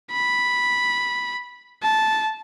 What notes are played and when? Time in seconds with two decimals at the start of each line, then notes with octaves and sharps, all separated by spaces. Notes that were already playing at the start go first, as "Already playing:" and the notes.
0.11 B5
1.83 A5